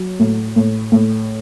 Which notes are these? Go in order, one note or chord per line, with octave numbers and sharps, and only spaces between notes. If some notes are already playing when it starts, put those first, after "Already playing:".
Already playing: F#3
A2
A2
A2